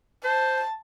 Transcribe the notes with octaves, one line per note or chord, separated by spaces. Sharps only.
C5 A5